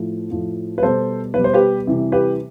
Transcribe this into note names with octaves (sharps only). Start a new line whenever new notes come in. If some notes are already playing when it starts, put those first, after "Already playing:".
Already playing: A2 F3
A2 F3
B4
B2 G3 A4 C5
B2 G3 B4
C5
G4 B4
C3 E3 G3
G4 B4